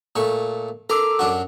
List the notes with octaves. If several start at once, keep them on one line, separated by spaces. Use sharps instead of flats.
A#2 A3 C#6
A4 A#4 A#5 D6 E6
F#2 D4 F#4